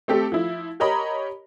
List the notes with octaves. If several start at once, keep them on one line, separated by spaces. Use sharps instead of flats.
A3 C4 G4 A4
F3 E4
G4 A#4 C#5 D#5 A#5 B5